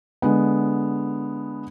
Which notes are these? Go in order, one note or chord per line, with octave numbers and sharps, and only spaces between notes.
D3 G#3 B3